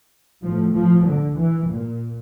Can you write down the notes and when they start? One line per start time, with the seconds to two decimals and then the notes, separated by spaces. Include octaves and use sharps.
0.43 A2 F3
0.74 F3
1.05 D3
1.38 E3
1.69 A#2